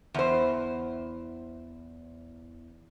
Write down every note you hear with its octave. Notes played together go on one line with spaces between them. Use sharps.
E2 C5